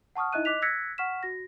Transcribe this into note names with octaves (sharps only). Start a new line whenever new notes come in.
F#5 A5 C#6 D#6 F6
D#4 E4 D#5 E5 F#6 D#7
D#5 D6 F#6 B6 F7
E6 F#6 G#6 A#6 B6 C#7
F#5 C#6 F6 B6 E7
F#4 A#6